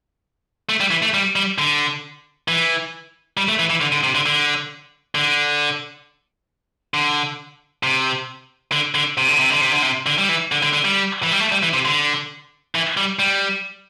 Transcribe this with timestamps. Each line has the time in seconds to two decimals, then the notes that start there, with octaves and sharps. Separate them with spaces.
0.69 A3
0.80 G3
0.91 E3
1.02 A3
1.14 G3
1.36 G3
1.58 D3
2.48 E3
3.37 G3
3.49 A3
3.59 E3
3.70 E3
3.81 D3
3.92 D3
4.03 C3
4.15 D3
4.26 D3
5.15 D3
6.94 D3
7.83 C3
8.72 D3
8.95 D3
9.18 C3
9.28 D3
9.39 C3
9.50 D3
9.61 C3
9.71 D3
9.82 C3
10.06 D3
10.18 G3
10.29 E3
10.52 D3
10.63 D3
10.73 D3
10.85 G3
11.23 E3
11.32 G3
11.40 A3
11.52 G3
11.63 E3
11.74 C3
11.85 D3
12.75 E3
12.97 G3
13.19 G3